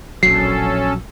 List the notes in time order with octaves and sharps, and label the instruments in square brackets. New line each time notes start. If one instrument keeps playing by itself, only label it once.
[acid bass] E1 [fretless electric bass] A#1 F#3 [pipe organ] C#4 A4 [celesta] C7